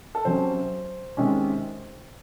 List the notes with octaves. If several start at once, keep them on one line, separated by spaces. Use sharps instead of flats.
A4
C3 F#3 C#4 C5
C3 D#3 G#3 C#4